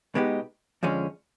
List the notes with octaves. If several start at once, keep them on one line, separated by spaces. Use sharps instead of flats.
B2 G#3 B3 D#4 G4
F2 D3 F3 G#3 C#4